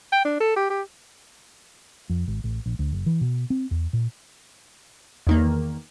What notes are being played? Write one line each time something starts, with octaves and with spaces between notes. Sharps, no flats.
G5
D4
A4
G4
G4
F2
G#1
A1
A#1
D2
F#1
E3
B2
C4
E2
A#2
E2 D#3 A#3